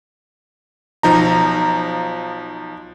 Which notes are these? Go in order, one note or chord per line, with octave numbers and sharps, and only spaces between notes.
B1 F3 D#4 A#5